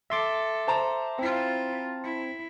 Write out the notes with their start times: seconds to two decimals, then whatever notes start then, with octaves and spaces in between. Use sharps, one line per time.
0.10 A4 E5 C6 D6
0.67 C5 A5 A#5
1.19 C4 E4 F4
2.04 E4